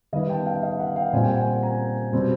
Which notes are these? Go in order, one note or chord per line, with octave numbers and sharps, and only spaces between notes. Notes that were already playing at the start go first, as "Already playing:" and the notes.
D#3 G3 B3 D#4 D#5 F5
G5 A5
F5 G5
D#5 F5
E5 F#5
F5 G5
A#2 G3 C4 G#5
G5
F#5 G#5
G#5 A#5
B2 G3 C4